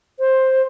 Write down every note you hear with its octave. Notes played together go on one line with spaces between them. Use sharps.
C5